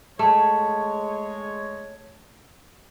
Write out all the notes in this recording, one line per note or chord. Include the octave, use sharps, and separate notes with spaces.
G#3 A3 C#5